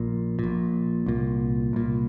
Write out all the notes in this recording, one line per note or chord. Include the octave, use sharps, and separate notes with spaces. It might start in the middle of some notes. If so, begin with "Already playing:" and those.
Already playing: A#1 A#2
A#1 A#2
C2 A#2
C2 A#2